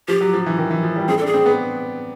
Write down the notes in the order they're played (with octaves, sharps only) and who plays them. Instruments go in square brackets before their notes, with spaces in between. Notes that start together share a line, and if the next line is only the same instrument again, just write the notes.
[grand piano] F3 [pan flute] G4
[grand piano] F#3
F3
E3
D#3
E3
F3
G3
[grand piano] C4 [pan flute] G#4
[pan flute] A4
[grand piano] D4
[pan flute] G#4
[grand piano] C4
B3